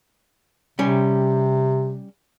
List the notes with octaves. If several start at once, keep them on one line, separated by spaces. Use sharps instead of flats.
C3 G3 C#4